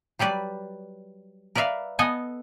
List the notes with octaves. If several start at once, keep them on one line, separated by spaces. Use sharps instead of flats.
F#3 G3 B4 D5
A#4 B4 D5 E5 F5
B3 A4 D#5 G#5